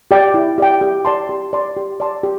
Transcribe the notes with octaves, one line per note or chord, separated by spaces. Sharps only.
G4 D5 G5
E4
G4 D5 G5
G4
D5 A5 C6
G4
D5 A5 C6
G4
D5 A5 C6
G4